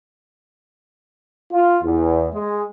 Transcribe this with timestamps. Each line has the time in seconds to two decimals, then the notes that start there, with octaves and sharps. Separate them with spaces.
1.53 F4
1.84 E2
2.34 G#3